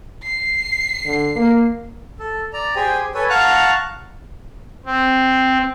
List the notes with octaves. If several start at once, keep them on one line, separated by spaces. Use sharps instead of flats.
C7
D3
A#3
A4
D5 A#5
G4 G#4 C5 G5 G#5
A4 B4 C#5 G#5
F5 F#5 A5 A#5 C#6 F#6
C4